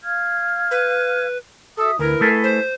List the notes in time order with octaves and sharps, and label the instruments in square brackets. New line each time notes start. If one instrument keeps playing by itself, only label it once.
[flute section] F5 F6 G#6
[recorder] B4
[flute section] F#4 E5 D#6 [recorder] A4
[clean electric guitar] D2 [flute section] E4 B4 [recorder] A#4
[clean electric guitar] A3 G#4 A4
[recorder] C5